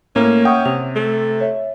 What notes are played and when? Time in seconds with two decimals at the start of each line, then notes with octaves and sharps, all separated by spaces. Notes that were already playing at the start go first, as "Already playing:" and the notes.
0.16 A2 A#3 C#4
0.45 E5 F#5 G5 C#6 D#6
0.65 C3 F7
0.96 A3
1.40 C#5 E5